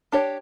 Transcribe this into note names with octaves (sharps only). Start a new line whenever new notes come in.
D4 G4 C#5